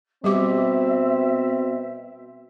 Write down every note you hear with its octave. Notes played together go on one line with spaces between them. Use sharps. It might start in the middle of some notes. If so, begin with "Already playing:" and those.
B2 G3 C4 G4 E5 D6